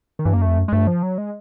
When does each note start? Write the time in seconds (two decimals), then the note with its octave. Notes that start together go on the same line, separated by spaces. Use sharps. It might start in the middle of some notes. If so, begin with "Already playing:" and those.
0.19 D#3
0.25 G2 E3
0.33 A#3
0.36 F#2
0.42 A3
0.47 F2
0.58 F#2
0.68 G#3
0.72 G2 A3
0.87 F3
1.03 F#3
1.18 G#3